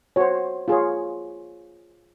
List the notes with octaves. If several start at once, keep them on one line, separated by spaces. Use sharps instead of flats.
F#4 C5 C#5
F4 G#4 C#5